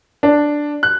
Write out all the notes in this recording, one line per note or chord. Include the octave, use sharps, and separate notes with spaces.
D4
F#6